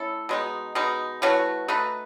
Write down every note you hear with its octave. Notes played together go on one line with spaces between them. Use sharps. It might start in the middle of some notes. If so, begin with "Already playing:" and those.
Already playing: A3 C#4 E4 A4
B2 G#3 D#4
B2 G#3 D#4
E3 A3 C#4 F#4
A3 D#4 F#4 B4